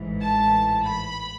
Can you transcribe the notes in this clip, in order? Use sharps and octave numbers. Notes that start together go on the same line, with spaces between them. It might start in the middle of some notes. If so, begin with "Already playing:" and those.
Already playing: A1 G#2 E3
A5
B5